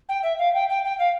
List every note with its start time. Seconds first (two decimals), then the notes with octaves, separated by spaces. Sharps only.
0.08 G5
0.22 E5
0.38 F5
0.53 G5
0.69 G5
0.84 G5
0.98 F5